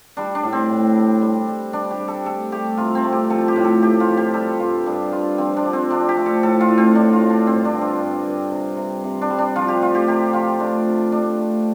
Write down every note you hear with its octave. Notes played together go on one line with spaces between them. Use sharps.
G3 D4
D4
A2
C4
A2
G3
G3
G3
G3 D4
G4
G3
A4
A3 A4
A3 G4
C3 F4
C4
A3
G4
F3 A4
G4
A2
A4
A3 G4
F4
F3
G4
G3 A4
G2 F4
G2 D4
G3 F4
F3 C4
D4
F3
C4
F3 D4
G4
A3
A4
A2 A4
F4
A2
C4
A2 D4
F4
A3
D4
G2 C4
D4
D3
F4
G2
G2
C3
C3
C3
D4
G3
D4
F3 F4
G4
A3 F4
G4
C3 G4
F3 F4
A3 D4
C3
A3 D4
A3